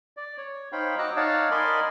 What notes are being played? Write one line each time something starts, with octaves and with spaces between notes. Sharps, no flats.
D5
C#5
D#4 C5 C#5 F5 G5 B5
F#4 D#5 A#5 D6 E6 F#6
D#4 C#5 D5 F5 F#5 A5
A#4 D5 D#5 G#5 B5 C6